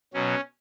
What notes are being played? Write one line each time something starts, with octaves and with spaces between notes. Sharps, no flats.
B2 F#3 C#4